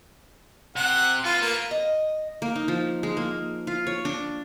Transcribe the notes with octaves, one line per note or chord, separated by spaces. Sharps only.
C3 F#5
F4 A4 B4
A#3
D#5
A#3
D#4
F3
G#3
A#3
F4
C#5
D4